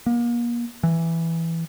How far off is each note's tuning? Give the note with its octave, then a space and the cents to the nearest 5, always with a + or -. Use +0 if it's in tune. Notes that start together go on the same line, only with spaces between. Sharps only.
A#3 +35
E3 +5